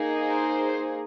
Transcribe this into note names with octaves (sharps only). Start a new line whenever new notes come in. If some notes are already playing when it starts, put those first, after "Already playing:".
Already playing: A#3 D#4 G#4
C5